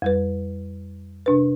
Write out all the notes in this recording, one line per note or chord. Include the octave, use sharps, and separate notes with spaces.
F2 G3 B4
C3 D4 B4